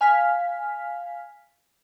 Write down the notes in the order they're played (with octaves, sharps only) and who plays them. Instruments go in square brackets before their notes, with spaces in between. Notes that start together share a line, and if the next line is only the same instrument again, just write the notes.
[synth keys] F5 G#5 F6 B6